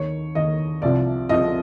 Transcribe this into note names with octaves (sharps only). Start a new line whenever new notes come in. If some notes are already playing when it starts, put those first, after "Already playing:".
Already playing: D#2 D#3 C#5
D#2 D#3 D#5
C2 C3 F3 D5
C2 C3 F3 D#5